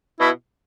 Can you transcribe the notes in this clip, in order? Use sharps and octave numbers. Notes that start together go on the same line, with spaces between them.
B2 E4